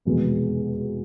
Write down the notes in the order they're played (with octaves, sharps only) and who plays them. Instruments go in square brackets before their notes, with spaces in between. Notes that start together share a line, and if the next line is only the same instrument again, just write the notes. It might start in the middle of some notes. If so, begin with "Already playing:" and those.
[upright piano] F1 E2 B2 G#3 B3